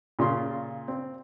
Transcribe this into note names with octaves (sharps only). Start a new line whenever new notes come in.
A#2 C#3 F4 C6
C4